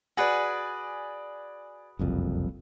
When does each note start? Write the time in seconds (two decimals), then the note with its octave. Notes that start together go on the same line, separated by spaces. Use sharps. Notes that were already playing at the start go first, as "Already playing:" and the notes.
0.17 F#4 G#4 B4 D5 G#5
1.99 F#1 C2 F2